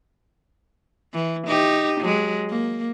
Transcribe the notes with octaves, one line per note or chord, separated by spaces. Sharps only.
E3
D#4 G4
F#3 G#3
A#3